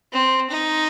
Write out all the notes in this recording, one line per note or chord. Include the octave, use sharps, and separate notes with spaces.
C4
D#4